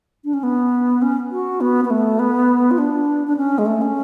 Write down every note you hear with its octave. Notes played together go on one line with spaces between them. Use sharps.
D4
C#4
B3
C#4
F#4
B3
B3
A3
B3
F4
D4
D4
C#4
G#3
A3
C#4